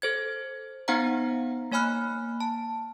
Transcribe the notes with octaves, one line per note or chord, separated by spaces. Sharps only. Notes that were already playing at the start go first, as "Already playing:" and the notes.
A4 C5 G#6
B3 D#4 C5 F5 F#5 A#5
A#3 C#5 G#5 B5 F6 F#6
A5